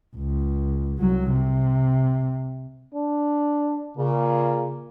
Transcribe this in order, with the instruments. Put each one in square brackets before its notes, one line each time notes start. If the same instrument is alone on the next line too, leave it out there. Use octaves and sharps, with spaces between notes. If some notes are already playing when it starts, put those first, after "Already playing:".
[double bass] C#2
C2 F#3
C3
[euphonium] D4
[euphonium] A#2 [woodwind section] C#3